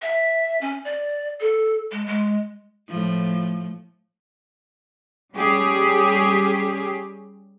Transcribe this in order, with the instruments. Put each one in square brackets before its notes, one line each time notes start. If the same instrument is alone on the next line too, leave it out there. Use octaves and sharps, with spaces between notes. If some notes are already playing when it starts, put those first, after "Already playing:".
[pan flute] E5
C#4
D5
A4
G#3
G#3
[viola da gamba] A2 F3
[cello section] G3 C#4 G4 G#4